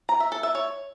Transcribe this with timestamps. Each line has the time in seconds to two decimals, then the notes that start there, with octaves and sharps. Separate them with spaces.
0.09 A#5
0.20 E5
0.32 A4
0.43 E5
0.55 C#5